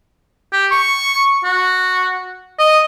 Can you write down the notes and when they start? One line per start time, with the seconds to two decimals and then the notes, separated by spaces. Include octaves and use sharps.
0.52 G4
0.71 C#6
1.44 F#4
2.59 D#5